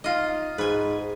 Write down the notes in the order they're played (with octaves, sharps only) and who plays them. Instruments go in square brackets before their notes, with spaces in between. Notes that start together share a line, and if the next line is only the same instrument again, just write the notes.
[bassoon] D#4 [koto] F4 D#5
[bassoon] G#2 [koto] B4 G#5